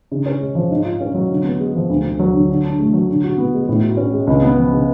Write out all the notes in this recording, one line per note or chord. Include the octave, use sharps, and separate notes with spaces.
C#3
C#4
G#3
F3
G#2
F4
C#4
F#3
D3
B3
G#3
F3
D2
D2
F#3
D3
D3
D4
A3
F#3
D3
F#4
B3
G#3
A2
F#4
C#4
G#3
C#2
B3
F3
C#3